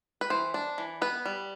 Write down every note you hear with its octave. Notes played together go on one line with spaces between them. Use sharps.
B4
E3 C5
D4
E3
B3 B4
G3